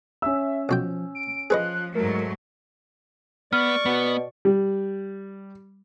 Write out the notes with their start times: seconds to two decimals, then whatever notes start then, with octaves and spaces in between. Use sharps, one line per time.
0.22 C#4 E5 E6
0.69 B1 F3 F#4 G5
1.15 D7
1.50 F3 G#4 B4 D#5 F#6
1.95 G#2 F#3 A3 A#4
3.53 B3 D5 C#6 F6
3.86 B2 B3
4.45 G3